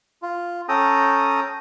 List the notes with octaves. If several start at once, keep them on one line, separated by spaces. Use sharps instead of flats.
F4
C#4 A4 G5 A#5 D#6